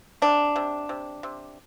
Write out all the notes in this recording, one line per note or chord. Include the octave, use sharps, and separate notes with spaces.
C3 D4
C3
C3
C3